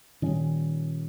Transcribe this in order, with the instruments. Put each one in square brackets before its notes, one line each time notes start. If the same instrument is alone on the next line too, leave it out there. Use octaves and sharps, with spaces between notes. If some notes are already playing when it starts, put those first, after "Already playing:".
[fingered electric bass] A#2 G3 C#4 [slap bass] D#3